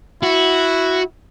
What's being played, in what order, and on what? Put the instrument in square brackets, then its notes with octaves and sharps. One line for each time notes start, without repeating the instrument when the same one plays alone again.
[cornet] E4 [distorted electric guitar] F#4